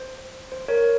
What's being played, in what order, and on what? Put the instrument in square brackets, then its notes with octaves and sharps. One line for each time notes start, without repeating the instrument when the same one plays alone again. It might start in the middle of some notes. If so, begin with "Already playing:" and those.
Already playing: [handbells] C5
C5
A#4 C#5